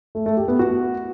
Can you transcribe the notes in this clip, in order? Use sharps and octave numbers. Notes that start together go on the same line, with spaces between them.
A3
A3
G4
B3
F#4